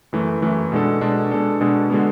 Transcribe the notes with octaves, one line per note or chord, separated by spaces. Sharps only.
F#2 E3 A3
F#2 E3 A3
B2 G#3 D4 A4
B2 G#3 D4 A4
B2 G#3 D4 A4
B2 G#3 D4 A4
D3 G#3 B3